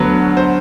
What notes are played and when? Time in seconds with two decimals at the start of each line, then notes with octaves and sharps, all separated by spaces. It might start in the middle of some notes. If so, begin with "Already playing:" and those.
Already playing: D2 D3 F#3 B3
0.37 C5